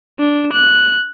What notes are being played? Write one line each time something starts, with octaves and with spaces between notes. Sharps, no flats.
D4
F#6